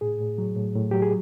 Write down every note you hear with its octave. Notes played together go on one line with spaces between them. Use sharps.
A2 G#4
A2
F#3
A2
A2
F#3 G4
G#4